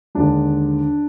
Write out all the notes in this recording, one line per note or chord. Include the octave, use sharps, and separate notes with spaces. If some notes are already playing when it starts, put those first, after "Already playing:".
D#2 D3 G#3 D4